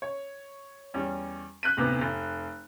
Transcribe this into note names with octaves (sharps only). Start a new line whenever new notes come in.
C#5
E2 G3 C#4
F#6 G6 B6 D#7
F1 D2 C3 B3
F1